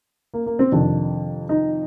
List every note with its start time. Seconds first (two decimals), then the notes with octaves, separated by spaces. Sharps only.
0.34 A#3
0.46 A#3
0.59 C4
0.72 F2 C3 D#3 D4
1.49 D#4